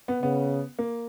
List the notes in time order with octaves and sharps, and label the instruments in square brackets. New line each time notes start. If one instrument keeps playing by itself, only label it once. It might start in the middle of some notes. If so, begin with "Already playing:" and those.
[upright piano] B3
[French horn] C#3 [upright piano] B3
[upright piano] A#3